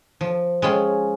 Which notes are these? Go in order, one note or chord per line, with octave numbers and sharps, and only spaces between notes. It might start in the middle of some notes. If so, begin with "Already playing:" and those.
F3
G#3 C#4 F4